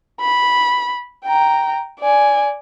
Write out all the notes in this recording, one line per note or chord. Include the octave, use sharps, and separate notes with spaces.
B5
G5 A#5
D5 G#5